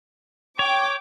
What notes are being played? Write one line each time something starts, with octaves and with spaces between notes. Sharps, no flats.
C#5 G5 D6